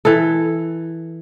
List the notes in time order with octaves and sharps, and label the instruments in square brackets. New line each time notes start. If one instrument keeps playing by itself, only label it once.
[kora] E3 A4